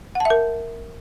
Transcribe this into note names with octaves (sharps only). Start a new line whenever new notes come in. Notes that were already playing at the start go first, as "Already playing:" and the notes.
F#5
A5
E5
A#4